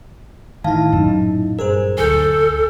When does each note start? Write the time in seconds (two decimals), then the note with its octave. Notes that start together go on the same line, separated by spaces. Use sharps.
0.64 A2 D#3 E4 F5 A5
0.93 F#2 A#2 F#3 D#4
1.59 G2 G#4 A#4 C5
1.98 D2 A4 G#5 G6